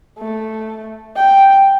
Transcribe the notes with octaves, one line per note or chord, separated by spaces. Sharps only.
A3
G5